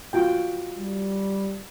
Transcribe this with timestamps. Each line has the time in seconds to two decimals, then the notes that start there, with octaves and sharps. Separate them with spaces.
0.13 F4 F#4 G5
0.77 G3